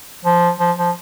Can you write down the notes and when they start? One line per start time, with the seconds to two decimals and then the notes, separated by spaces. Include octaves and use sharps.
0.25 F3
0.59 F3
0.78 F3